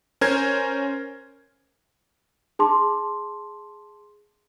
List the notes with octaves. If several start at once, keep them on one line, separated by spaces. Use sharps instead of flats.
C#4 A#4 C5 G#6
G#4 A5 C6 D6